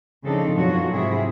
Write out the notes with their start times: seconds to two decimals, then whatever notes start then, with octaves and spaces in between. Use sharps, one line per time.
0.24 C#3 F3 C4 D4 D#4 A4
0.54 F#2 B2 F#3 F4 F#4 C#5
0.91 G#2 C3 E4 G#4